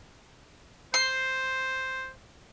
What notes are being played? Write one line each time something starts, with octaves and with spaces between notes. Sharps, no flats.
C5 C6